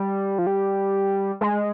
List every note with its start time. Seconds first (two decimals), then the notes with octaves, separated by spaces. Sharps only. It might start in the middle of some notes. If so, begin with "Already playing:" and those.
Already playing: G3
0.39 F3
0.47 G3
1.41 G#3